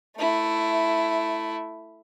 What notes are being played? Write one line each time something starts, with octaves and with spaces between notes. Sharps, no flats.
A3 E4